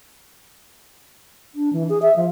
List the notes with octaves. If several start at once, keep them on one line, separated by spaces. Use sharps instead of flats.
D4
E3
G#4
E5
F3